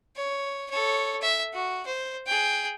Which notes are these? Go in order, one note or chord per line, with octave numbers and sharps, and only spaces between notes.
C#5
A4 C#5
E5
F#4
C5
G#4 G5